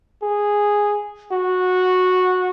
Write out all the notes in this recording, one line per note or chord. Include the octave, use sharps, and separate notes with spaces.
G#4
F#4